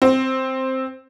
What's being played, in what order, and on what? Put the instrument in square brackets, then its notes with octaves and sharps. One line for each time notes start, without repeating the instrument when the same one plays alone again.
[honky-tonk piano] C4